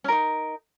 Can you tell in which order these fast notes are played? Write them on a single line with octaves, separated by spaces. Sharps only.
C#4 A#4 D#4